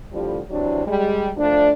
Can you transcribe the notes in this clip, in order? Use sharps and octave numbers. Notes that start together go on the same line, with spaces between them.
A2 D3 F3 G3
C3 E3 F#3 D4
G3 G#3
F3 A3 D4